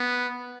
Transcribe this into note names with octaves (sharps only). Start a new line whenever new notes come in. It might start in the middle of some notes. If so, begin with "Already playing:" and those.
Already playing: B3